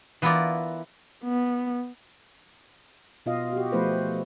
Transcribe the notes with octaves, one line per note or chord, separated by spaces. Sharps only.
E3 B3 E4 F4 A#4 D5
B3
B2 B3 F4 D#5 F5
F#4 G4
F3 A3 B3 E4 B4 C5